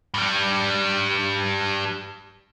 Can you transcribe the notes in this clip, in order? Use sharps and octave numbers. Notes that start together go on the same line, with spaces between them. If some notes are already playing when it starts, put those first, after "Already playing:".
G2 G3